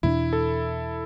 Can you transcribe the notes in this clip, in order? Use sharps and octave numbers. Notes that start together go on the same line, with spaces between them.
E2 B2 A3 D4 E4
A4